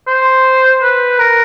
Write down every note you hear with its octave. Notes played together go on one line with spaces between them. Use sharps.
C5
B4
A#4